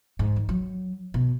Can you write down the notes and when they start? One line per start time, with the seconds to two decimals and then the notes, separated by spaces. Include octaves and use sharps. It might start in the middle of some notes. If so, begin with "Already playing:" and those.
0.19 G#2
0.36 D#3
0.49 F#3
1.14 B2